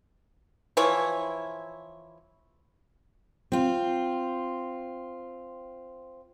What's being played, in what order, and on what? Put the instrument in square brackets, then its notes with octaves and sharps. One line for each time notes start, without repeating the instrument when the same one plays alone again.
[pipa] E3 F3 E4 C#5
[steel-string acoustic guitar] C4 F4